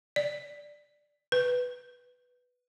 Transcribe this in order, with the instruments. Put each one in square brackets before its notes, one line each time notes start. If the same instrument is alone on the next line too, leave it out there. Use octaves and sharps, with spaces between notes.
[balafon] D5
B4